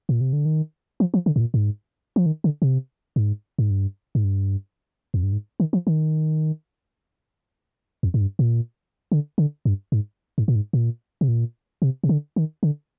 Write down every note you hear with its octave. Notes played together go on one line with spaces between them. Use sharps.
A#2
C3
D3
D#3
F3
F3
D3
G#2
A#2
G#2
F3
D#3
D3
C3
G#2
G#2
G2
G#2
G2
F2
G2
G#2
D#3
F3
D#3
F2
G#2
G2
A#2
D3
D3
G2
G#2
G#2
A#2
G#2
A#2
C3
A#2
C3
C3
D3
D#3
D3